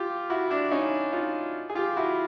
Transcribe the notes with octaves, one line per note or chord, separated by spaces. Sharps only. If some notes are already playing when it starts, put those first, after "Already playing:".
Already playing: F4 G4
E4 F#4
D4 E4
C#4 D#4
D#4 F4
G#4
F4 G4
E4 F#4